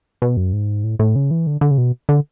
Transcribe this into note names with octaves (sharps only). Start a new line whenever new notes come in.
B2
F#2
G#2
A2
A2
C#3
E3
D3
D3
C#3
B2
D3